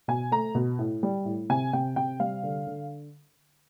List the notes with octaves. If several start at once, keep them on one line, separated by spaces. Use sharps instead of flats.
B2 G#5
A3 A#5
B2
A2
G3
A2
C3 G#5
C3 G5
C3 G5
G3 F5
D3
D3